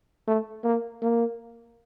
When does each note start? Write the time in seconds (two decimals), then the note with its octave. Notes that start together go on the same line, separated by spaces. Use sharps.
0.28 A3
0.64 A#3
1.02 A#3